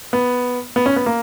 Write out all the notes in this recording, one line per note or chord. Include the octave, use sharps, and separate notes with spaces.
B3
B3
C#4
B3
A#3